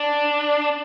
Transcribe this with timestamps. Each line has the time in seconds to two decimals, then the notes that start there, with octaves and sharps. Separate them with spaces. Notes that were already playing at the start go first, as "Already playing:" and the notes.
Already playing: D4